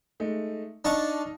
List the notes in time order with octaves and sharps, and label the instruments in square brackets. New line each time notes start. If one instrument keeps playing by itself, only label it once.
[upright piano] G#3 A3 D#4
[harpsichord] D4 A5 C#6 [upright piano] D#4 D#5 F5